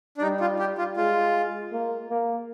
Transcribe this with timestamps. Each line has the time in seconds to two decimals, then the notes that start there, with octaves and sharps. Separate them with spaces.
0.18 D4
0.22 G3 D#4
0.40 F4
0.59 G4
0.78 F4
0.97 G#3 F4
1.72 A#3
2.10 A#3